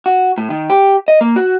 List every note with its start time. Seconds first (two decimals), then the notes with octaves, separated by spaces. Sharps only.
0.06 F#4
0.38 A2
0.50 D#3
0.70 G4
1.08 D#5
1.21 A#3
1.36 F#4